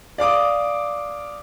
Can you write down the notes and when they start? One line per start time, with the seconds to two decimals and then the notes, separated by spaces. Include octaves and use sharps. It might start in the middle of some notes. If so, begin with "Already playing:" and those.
0.18 D5 F5 D6 D#6